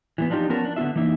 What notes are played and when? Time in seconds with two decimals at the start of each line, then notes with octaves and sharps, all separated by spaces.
0.18 E3 G3 B3
0.30 F3 D4 D#4 F4 G4
0.49 F3 B3 C#4 A#4 A5
0.65 D4
0.76 D3 B3 F4 E5
0.96 E3 A#3 D#4 E5